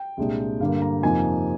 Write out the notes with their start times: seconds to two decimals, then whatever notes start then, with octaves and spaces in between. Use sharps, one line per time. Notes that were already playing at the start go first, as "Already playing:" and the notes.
Already playing: G5
0.17 C2 A#2 G#3 D4
0.60 G2 D3 G3 A#3 F5
0.82 A#5
1.03 F2 C3 F3 A#3 D#4 G#5